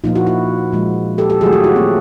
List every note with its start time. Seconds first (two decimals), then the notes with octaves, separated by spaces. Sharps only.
0.04 A#2 F3 A#3 D#4 F4
0.15 E4 F#4
0.27 E4 F#4
0.72 A#2 F3 G#3
1.18 G4 A4
1.30 G4 A4
1.41 D#3 F#3 A3 F#4 G#4
1.52 F4 G4
1.64 E4 F#4
1.76 A#3 C4